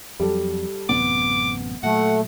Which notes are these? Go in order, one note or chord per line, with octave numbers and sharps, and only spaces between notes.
F2 F#3 G3 A4
A1 F#2 C3 B3 D6
A#2 F#3 A3 F#5